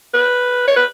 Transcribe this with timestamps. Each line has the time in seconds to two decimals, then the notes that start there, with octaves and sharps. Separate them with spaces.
0.14 B4
0.68 C#5
0.76 B4